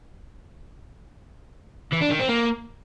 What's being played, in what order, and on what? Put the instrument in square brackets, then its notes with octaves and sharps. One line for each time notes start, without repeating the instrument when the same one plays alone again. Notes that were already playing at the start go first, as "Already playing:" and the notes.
[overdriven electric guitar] E3
D4
D#3
C4
A#3